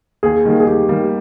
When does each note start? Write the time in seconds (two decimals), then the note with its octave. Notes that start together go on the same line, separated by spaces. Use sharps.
0.23 D#2 G#4
0.45 D#3 G3 A#3
0.60 G#4
0.67 D#2 G4
0.89 D#3 G3 A#3